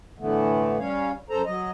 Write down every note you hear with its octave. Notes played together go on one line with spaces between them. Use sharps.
A2 D3 E3 A3 B3
G3 C#4 C#5 F5
F#2 A4 C5 A#5
F#3 D#5